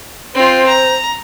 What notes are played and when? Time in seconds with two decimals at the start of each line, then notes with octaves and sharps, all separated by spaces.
0.35 C4 F4 C5
0.68 A#5